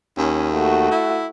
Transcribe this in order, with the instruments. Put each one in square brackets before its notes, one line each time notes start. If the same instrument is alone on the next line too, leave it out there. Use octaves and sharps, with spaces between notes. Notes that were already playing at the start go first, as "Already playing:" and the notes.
[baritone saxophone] D#2 [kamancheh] C#4
[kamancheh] A3 F#4
[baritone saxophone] E4